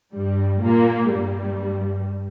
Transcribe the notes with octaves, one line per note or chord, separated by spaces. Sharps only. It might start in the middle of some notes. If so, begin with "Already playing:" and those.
G2 G3
A#2 A#3
G2 G3